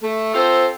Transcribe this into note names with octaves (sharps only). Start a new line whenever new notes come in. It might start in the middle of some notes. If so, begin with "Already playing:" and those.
A3
C4 F4 A4 C5